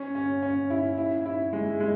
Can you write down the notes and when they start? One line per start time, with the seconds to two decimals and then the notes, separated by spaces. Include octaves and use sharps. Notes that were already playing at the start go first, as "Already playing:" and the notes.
Already playing: C#4
0.15 C#4
0.42 C#4
0.70 E4
0.98 E4
1.25 E4
1.53 G#3
1.80 G#3